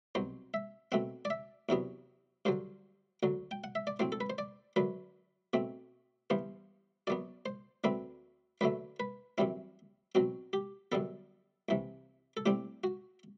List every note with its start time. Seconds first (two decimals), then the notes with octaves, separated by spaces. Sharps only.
0.15 C2 B2 F#3 C5
0.54 E5
0.92 B2 A3 C4 F#5
1.25 D5
1.30 E5
1.69 E2 C3 F#3 B3
2.45 G2 D3 F#3 C5
3.23 D2 D3 F#3
3.51 G5
3.64 F#5
3.75 E5
3.87 D5
4.00 A2 F#3 C4 C5
4.12 A4
4.21 B4
4.30 C5
4.38 D5
4.76 F#2 D3 F#3 B4
5.53 B2 A3 C4
6.30 G2 E3 B3 C5
7.07 F#2 F#3 B3 D5
7.46 C5
7.84 D2 D3 A3 C4 B4
8.61 F#2 D3 F#3 A3 B4
9.00 B4
9.38 F#2 E3 G3 C4 E4
10.15 B2 F#3 C4 F#4
10.53 G4
10.92 F#2 D3 G3 B3 A4
11.69 C2 C3 E3
12.37 A4
12.46 A2 G3 C4 G4
12.84 F#4